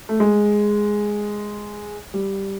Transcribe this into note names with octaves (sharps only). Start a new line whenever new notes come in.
A3
G#3
G3